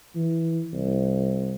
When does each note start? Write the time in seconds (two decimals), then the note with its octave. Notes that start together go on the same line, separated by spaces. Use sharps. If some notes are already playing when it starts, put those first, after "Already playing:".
0.15 E3
0.73 C2